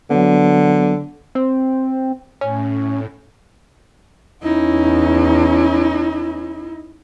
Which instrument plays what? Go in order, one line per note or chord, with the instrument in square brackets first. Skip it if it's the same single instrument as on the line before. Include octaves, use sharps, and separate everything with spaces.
[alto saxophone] D3 [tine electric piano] F#3 B3
[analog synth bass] C4
[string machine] A2 [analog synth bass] C#4
[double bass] E2 C#4 [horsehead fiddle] D#4 E4